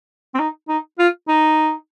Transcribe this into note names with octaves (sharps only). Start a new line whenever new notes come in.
C4
D#4
D#4
F4
D#4